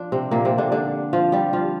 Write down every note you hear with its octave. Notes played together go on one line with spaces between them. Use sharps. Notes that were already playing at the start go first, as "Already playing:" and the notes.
Already playing: F3 D4 F4
C3 C4
A#2 A#3
C3 C4
D3 D4
D3 D4
F3 F4
G3 G4
F3 F4